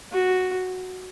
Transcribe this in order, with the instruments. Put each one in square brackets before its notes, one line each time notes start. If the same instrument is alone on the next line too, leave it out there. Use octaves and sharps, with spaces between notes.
[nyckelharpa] F#4